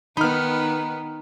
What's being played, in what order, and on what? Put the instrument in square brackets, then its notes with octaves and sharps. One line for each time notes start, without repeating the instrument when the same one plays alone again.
[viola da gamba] D#3 B3 [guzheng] D#4 [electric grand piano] B5 F6